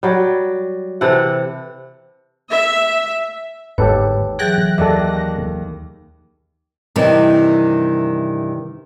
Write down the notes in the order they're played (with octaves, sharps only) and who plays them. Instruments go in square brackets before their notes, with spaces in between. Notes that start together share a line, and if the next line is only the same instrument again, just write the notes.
[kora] F#3 G3
C3 E3 A4 F#5
[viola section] E5
[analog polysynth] G1 D#2 G#2 [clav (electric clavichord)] G4 A4 B4 [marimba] C#5
[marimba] E3 F#3 G#4 [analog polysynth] G5 F#6 A#6
[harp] D#2 [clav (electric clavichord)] A4 D5 E5
[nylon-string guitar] G2 C3 D#3 E3 G3